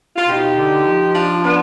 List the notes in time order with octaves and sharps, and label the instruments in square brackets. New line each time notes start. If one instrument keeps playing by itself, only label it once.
[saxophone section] F4
[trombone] B2 [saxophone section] D#4 G4
[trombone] D3
F3
[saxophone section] D4 F4
B3 D4